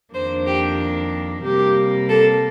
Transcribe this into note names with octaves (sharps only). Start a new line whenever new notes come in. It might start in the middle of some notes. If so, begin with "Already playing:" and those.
F2 D#3 A#3 D4 C5
G4
C3 G3 A#3 G4
A4